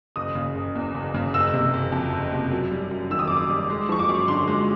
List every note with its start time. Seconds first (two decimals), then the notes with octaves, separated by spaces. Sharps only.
0.16 F#1 D#6
0.35 C#3
0.55 F#1
0.75 E2
0.94 F#1
1.14 C#3
1.34 F#1 E6
1.54 C3
1.73 F#1
1.92 F2
2.12 F#1
2.32 C3
2.51 F#2
2.71 G3
2.91 F#2
3.10 D#3 E6
3.19 D#6
3.28 F#2 D6
3.37 D#6
3.50 G3
3.70 G#3
3.89 F3 C#6
3.99 D6
4.09 F#2
4.28 D3 C6
4.48 G#3